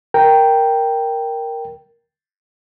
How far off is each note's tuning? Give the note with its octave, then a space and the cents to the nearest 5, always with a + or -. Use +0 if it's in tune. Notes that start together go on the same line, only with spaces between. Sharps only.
A#4 +0 G5 +0